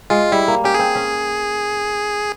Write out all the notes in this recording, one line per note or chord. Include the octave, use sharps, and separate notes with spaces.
G#3 F4
G3 E4
A#3
C#4 G4
C4 G#4
C#4